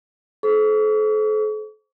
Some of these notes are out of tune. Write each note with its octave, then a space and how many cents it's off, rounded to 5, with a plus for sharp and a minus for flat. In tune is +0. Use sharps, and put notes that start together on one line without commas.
A4 -40 C5 +0 C#6 +45